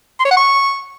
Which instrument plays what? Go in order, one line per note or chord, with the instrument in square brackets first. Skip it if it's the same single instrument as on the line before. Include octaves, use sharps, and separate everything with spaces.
[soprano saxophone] C6
C#5
F#5
C#6